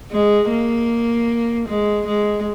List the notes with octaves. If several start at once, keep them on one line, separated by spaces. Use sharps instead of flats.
G#3
A#3
G#3
G#3